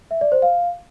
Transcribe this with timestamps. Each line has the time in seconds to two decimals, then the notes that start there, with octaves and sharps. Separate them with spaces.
0.11 E5
0.21 D5
0.32 C5
0.42 F5